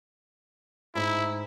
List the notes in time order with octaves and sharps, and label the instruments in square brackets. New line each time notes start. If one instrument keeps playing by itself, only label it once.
[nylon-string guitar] G#2 D#4 [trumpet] E4